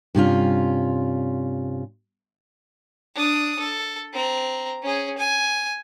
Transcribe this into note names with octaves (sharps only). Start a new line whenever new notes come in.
G2 C3 C#4 F4
D4 D#6
A4
C4 A#5
C#4 G#4
G#5